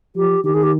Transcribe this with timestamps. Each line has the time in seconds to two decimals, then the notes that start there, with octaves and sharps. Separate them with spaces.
0.16 F3 G4
0.44 D#3 G4
0.54 G#4
0.63 G4